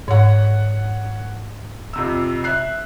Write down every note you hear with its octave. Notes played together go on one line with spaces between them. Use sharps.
G#2 C#5 F#5
F2 C3 E6
E5 F#6 C7